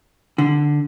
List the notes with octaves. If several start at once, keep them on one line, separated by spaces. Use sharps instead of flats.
D3